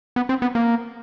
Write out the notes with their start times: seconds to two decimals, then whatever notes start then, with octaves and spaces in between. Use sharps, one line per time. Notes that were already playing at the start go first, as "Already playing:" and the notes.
0.16 B3
0.29 C4
0.42 B3
0.55 A#3